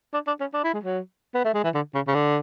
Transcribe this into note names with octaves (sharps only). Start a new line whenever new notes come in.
D4
D4
C#4
D4
E4
G#3
F#3
B3
A3
G#3
E3
D3
C#3
C#3
D3